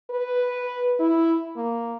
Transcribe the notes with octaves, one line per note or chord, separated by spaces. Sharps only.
B4
E4
A#3